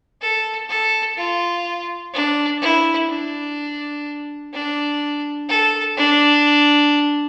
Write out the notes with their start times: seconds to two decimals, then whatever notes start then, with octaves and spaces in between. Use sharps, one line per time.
0.21 A4
0.69 A4
1.17 F4
2.13 D4
2.61 E4
3.09 D4
4.53 D4
5.48 A4
5.96 D4